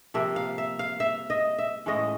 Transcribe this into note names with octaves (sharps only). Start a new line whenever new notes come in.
C3 F3 A#3 E5
F5
E5
F5
E5
D#5
E5
A2 E3 G#3 C#4 D#5